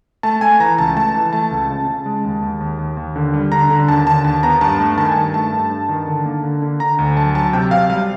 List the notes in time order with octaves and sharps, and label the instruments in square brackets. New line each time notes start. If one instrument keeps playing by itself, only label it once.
[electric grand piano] A3 A5
A3 G#5
E3 A#5
C#2 A5
A3 A5
E3
A3 A5
C#2
C#3
C#3
G#3
D#2
D#2
D#2
D#2
D#2
D3
G3
D3 A#5
D3
D#2 A5
D3 A5
D#2 A5
B3 A#5
G2 A5
A3
D#3 A5
G#5
G2 A5
A3 A5
G2
G2
D#3
D3
A#3
D3
D3
D3 A#5
D2
F#3 A5
F#3 A5
C3 G5
C3 F5
G3 F5